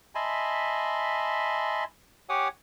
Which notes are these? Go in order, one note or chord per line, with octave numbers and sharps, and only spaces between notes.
D#5 E5 G#5 A5 B5 C6
G4 C#5 F#5 G#5 D6 D#6